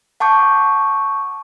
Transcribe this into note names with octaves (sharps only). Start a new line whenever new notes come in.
F#5 A5 C#6 D6 G6